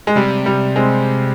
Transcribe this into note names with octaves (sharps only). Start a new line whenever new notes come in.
G#3
C3 G3
G3
G#3 C4